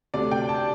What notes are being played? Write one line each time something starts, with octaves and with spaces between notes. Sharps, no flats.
D2 C3 A3 D4 D5
G5
A5